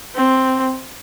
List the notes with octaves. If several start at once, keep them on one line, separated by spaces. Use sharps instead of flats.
C4